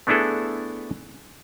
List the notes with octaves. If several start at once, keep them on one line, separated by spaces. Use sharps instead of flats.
A3 B3 D4 E4 G#4 A4